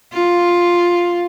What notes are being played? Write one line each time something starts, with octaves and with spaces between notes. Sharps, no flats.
F4